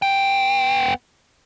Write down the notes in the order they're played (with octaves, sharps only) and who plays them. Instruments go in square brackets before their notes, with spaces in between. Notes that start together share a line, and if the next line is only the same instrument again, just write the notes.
[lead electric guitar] B3 G5